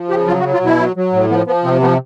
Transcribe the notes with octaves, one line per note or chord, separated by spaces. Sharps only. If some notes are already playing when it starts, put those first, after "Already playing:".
Already playing: F3
C#3 G4
F#3 F4
F#4
F#3
F4
B2 E4
F#3
F#3
A2
F3 B3
F3 B3
C3 C4
F3 B3